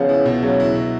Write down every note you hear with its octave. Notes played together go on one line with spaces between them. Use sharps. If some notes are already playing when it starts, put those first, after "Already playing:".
Already playing: C#3 F3 B3
E4
B2
C#3 F#3
E4
B2